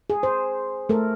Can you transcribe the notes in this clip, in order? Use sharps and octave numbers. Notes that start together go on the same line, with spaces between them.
G#4
C5
A3 A4 A#4